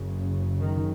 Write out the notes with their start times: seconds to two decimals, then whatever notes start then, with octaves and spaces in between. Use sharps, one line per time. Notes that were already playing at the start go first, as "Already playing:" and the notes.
Already playing: F#1 F#2 C#3
0.61 D#3